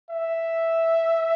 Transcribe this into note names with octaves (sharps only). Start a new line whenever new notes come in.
E5